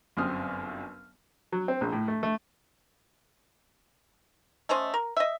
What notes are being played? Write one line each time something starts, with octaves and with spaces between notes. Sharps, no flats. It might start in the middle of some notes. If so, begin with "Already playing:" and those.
G1 F#2 C4 D#6 F6
F#3
C4
A#1
A2
A3
A3
A3 C#4 C5 D#5
A#4
D#5 E5